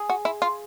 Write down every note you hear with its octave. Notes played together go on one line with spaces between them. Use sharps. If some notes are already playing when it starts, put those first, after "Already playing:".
Already playing: G#4
F#4
E4
F4